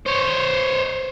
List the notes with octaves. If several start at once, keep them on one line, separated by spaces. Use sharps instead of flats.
C5 C#5